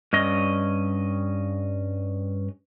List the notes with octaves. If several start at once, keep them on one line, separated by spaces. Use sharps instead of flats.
G2 C#4 D#5